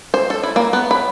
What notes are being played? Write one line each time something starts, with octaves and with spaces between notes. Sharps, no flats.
C5
A4
E4
A#3
B3
B5